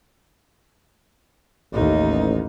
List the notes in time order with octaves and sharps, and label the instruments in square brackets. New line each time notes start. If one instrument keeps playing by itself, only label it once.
[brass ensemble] A1 [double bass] D#2 D#4